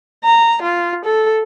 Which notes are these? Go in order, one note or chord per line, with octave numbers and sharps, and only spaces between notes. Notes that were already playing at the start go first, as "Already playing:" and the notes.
A#5
F4
A4